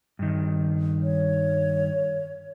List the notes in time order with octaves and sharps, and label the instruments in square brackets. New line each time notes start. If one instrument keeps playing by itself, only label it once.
[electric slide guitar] G2 D#3
[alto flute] C#5